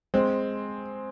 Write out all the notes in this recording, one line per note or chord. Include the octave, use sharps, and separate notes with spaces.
G#3 C4